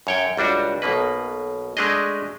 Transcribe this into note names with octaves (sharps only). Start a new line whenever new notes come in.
F#2 C#5 G5
C#2 G3 D4 F#4
B1 B2 A#3 B4
G#3 A3 D4 G#4 D#5